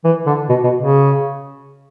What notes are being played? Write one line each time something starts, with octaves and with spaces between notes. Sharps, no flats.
E3
D3
B2
B2
C#3